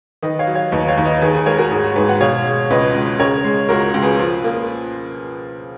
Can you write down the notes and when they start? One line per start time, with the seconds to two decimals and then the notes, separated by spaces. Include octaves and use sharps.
0.23 D#3 B4 D#5
0.39 C#5 F5
0.47 F#3
0.55 C#5 F5
0.72 D#2 B4 D#5
0.88 C#5 F5
0.97 D#2
1.05 B4 D#5
1.22 D#3 G#4 B4
1.34 G#4 B4
1.46 G#3 A#4 C#5
1.59 F#4 A#4
1.71 G#2 G#4
1.84 F#4
1.96 G#2 G#4 B4
2.09 F#5
2.20 B2 C#5 F5
2.46 G#3
2.70 C#2 B4 D#5
2.94 C#2
3.19 C#3 A#4 C#5
3.44 G#3
3.69 C#2 F#4 A#4
3.94 C#2
4.03 G#4 B4
4.18 F3
4.44 A#3